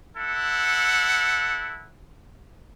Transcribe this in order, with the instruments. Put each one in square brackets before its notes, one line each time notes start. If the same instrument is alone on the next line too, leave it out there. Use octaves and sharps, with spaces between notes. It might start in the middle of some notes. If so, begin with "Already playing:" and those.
[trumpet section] E4 A4 F#5